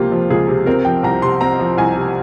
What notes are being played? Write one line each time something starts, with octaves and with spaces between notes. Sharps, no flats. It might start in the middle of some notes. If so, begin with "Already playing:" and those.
Already playing: C#2 C3 F3 A#3 F4 G4
F3
C#2 G#4
C3
C4 A#4
F3 G5
C2 A#5
C3 C6
C4 A#5
F3
C2 G#5
C3